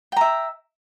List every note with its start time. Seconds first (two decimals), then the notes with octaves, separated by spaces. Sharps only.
0.12 G5
0.17 A#5
0.21 E5